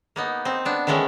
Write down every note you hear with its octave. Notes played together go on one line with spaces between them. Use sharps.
A#3 B3 D#4
C4 D#4
B3 D4
D#3 E3 G#3 A3 C#4